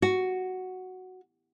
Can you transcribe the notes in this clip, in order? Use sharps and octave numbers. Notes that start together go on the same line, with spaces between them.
F#4